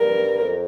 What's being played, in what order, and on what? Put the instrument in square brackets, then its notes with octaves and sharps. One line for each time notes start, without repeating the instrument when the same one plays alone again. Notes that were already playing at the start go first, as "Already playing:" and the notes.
Already playing: [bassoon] G2 [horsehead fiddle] A#4
[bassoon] F2